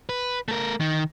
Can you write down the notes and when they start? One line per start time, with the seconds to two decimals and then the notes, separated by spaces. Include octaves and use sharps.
0.09 B4
0.48 A3 A#4
0.80 D#3